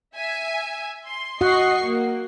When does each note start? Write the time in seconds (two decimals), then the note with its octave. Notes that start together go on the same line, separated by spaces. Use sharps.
0.15 E5 G#5
1.06 C6
1.41 F#4 D#5 F#5 C#6 C7
1.83 A#3